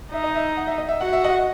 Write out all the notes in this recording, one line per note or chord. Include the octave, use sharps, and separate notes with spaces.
D#4 E5
D#5
E5
F#5
E5
D#5
E5
F#4 F#5
E5
D#5 F#5